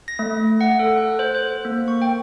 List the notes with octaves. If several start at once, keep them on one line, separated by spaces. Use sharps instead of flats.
A#6
A3
F#5
A4
F#6
C5
C5
A#3
C#6
G5